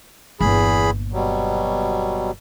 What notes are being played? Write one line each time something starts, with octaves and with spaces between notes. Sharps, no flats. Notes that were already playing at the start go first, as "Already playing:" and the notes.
G1 E2 A#2 G#4 B5
B2 F#3 G3